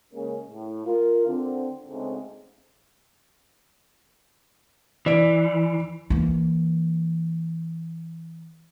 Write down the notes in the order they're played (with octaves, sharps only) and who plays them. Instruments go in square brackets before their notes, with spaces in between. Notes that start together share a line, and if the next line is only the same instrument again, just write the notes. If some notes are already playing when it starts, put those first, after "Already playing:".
[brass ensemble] C#3 G#3 A#3 C#4 G#4 A#4
A2
F4 A#4
D3 C4
D2 G#2 C#3 G#3 A3 C4
[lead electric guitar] E3 [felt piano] D5 D7
[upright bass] E3 A#3